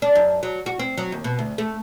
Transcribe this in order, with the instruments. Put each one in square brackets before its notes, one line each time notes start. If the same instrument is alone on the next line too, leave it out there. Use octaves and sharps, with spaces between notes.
[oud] D4
F#2
F#3
F#4
C4
F#3
D#2
B2
D2
A3